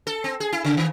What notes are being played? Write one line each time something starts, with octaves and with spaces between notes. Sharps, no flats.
A4
C4
G#4
E4
C#3
D#3